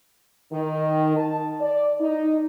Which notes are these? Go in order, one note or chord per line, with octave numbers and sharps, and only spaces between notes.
D#3
A5
D5
D#4